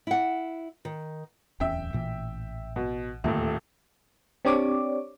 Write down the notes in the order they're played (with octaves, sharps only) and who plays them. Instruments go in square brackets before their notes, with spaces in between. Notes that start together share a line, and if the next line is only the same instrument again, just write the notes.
[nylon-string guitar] E4 F#5
D#3
[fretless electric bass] D1 E2 C#4 [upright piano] E5 G5
[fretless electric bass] A1 A#2 E3
[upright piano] B2
[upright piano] D#1 A2 [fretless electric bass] D2 A#3
[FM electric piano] C4 D4 G4 C#5 D5 D6